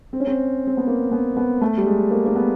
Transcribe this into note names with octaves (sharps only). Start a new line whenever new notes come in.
C4
C#4
C4
C4
B3
A#3
B3
B3
A3
G3
G#3
A#3
A#3
B3